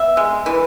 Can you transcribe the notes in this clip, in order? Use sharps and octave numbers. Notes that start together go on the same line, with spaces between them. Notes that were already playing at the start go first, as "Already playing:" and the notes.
Already playing: B3 E5
G#3
E3